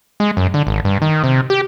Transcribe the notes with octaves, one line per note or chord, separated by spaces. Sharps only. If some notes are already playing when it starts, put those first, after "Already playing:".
G#3
F#2
D3
G#1
G2
D#3
C3
G4